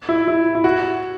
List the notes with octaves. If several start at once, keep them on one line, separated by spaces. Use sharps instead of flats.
E4
E4
E4
F#4